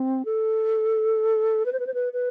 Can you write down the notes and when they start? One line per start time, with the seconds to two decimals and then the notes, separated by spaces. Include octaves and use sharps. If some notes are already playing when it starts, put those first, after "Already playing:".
Already playing: C4
0.25 A4
1.65 B4
1.72 C5
1.79 B4
1.87 C5
1.94 B4
2.13 B4